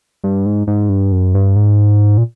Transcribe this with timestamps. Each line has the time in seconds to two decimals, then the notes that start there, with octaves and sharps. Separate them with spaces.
0.24 G2
0.46 G#2
0.67 G#2
0.89 G2
1.12 F#2
1.35 G2
1.56 G#2
2.17 A#2